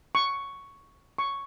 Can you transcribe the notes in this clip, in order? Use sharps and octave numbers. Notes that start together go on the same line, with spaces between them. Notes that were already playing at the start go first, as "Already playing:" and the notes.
C#6
C#6